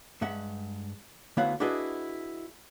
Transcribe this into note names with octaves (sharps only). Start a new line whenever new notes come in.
G2 G#3 E5 F#5
D2 B3 E4 C#5 F5 F#5
D4 E4 F#4 G#4 B4 D#5